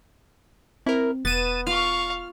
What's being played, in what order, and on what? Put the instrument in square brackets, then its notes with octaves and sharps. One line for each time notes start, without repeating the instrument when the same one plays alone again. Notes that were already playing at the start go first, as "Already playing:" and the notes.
[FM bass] C4 [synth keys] E4 A#4
[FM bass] E1 [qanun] B3 [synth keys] A6 D#7 E7
[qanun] F4 [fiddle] F5 C#6 [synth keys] F6